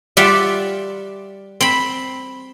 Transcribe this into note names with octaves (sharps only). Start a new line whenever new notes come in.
G3 F4 D5 E5 F#5
C4 B5